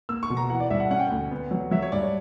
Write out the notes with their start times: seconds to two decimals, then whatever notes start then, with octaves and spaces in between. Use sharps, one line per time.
0.09 A#3 E6
0.23 C#6
0.30 B2
0.37 A#5
0.50 E3 F#5
0.60 D5
0.70 G2 E5
0.80 F#5
0.90 C#4 F#5
1.00 G5
1.08 D2 F#5
1.31 B3
1.51 F#3
1.71 F#3 E5
1.82 C#5
1.92 G2 D5
2.03 C#5